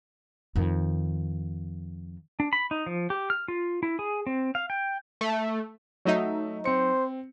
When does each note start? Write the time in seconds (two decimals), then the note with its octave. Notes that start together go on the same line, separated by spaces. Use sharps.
0.56 F2 D#3
2.40 D4
2.53 B5
2.71 D#4
2.86 F3
3.10 G4
3.30 F6
3.48 F4
3.83 E4
3.99 G#4
4.27 C4
4.55 F5
4.70 G5
5.21 A3
6.05 F#3 A3 D#4 E5
6.65 C4 C5 C#7